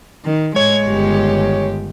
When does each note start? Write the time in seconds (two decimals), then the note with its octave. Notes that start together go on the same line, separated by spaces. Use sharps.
0.25 D#3
0.56 A2 G#3 C#5 G#6
0.87 G1 D#3 G4